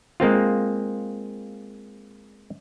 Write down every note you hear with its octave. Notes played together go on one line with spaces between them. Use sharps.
G#3 A#3 C4 F4